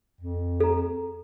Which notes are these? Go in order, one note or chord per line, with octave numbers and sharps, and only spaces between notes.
F2
A4 A#5